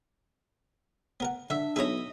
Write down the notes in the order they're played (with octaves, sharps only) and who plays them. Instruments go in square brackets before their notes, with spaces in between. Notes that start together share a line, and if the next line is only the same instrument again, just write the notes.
[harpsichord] B3 A#4 F#5
[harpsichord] D3 [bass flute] D4 [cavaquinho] E5
[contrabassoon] B1 [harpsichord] G#4 B4 C#5 [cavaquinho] D#5 E5